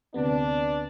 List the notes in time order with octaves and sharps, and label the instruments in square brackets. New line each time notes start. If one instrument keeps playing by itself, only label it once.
[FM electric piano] D2 C3 B3 [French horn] D4